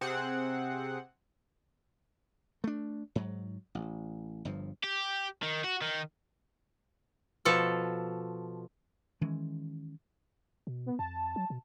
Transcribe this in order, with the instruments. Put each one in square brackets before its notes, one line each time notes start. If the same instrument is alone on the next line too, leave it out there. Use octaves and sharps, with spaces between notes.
[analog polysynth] C3 C4 G#4 F#5
[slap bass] A3 D4
G#2 F#3
A1
G1 G2 F3
[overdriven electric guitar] G4
D#3
F#4
D#3
[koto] B2 F3 A4
[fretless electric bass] D#3 E3 G#3 C#4
[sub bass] B2
[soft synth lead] B3
[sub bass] F2 [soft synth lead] A5
[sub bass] F#3
B2